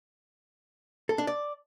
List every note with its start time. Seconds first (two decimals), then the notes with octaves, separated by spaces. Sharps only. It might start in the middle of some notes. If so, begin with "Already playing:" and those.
1.09 A4
1.18 D4
1.27 D5